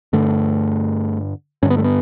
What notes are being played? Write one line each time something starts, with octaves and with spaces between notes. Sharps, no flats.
G2 D3 A3
G2 D3 C#4
B3
A3
B3